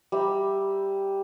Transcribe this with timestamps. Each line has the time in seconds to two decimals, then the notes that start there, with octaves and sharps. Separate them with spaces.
0.12 G3 E5 A#5 E6